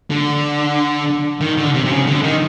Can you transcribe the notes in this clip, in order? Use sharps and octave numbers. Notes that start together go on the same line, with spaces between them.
D3
D#3
D3
C3
C3
C#3
D3
D#3